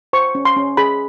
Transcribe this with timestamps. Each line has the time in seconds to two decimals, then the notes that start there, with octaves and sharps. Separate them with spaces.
0.13 C5 C#6
0.35 C#4
0.45 C6
0.56 C#4
0.77 G#4 B5